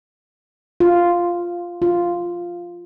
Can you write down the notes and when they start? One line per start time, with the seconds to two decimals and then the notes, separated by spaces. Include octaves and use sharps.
0.80 F4
1.82 F4